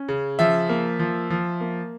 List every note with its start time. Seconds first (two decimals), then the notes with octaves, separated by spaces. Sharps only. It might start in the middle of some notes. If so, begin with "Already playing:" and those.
Already playing: C#4
0.08 C#3
0.39 F3 E5
0.69 A#3
0.99 F3
1.30 F3
1.61 A#3